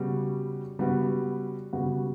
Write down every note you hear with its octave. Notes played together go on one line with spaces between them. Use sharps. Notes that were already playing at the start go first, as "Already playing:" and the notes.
Already playing: C#3 G3 B3 F#4
C#3 G3 B3 F#4
C#3 G3 B3 F#4